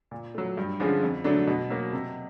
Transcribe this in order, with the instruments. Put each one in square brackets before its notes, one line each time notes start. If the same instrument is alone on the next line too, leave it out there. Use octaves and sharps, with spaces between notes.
[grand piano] A#2
F#3 A3
G2
D3 F3 G#3 C#4
F2
D3 F#3 A3 D4
B2
F#3 A#3
C3